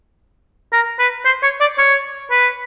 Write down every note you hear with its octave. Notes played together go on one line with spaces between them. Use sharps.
A#4
B4
C5
C#5
D5
C#5
B4